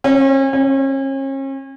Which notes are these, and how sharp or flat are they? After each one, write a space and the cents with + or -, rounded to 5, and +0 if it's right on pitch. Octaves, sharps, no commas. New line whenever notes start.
C#4 -40
C#4 -40